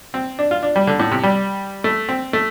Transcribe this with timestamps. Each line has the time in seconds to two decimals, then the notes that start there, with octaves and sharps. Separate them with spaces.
0.14 C4
0.39 D4
0.51 F4
0.63 D4
0.76 G3
0.87 D3
1.00 A2
1.11 C3
1.23 G3
1.84 A3
2.09 C4
2.33 A3